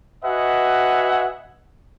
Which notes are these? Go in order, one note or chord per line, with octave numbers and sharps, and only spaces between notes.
F#4 B4 D#5 E5 F#5 G#5